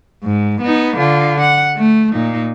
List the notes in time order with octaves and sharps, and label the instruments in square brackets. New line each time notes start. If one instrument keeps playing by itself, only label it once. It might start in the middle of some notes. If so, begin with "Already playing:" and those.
[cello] G#2
B3 D#4
D3 F4
F#5
A3
A#2 D#4